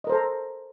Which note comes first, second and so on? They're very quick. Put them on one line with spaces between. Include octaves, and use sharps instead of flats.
D#5 A#4 C5 A4 A#5